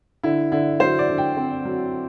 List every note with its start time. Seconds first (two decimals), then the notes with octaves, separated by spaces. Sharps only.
0.23 D3 E4
0.52 D3 E4
0.80 F#3 C5
0.99 D5
1.09 D3
1.18 G5
1.37 C4
1.65 F#3